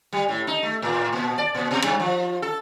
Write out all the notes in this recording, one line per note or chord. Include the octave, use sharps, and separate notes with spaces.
G3
A2
D#4
A3
A2
A#2
D5
A#2
B2
G2
F3
A4